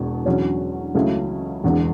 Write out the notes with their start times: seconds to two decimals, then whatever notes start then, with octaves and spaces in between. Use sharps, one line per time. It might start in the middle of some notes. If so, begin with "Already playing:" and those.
Already playing: E1 E2 B2
0.26 E2 D3 F#3 C#4
0.95 C#2 C#3 F#3 A3 E4
1.64 E1 E2 D3